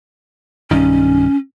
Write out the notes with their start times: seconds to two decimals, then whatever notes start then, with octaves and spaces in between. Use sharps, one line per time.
0.71 B1 G2 D#3 C#4